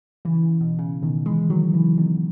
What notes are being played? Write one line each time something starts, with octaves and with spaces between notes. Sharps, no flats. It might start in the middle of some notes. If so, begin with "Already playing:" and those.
C#3 E3
C#3
B2
C#3
B2 D#3
E3 G#3
D#3 F#3
C#3 E3
B2 D#3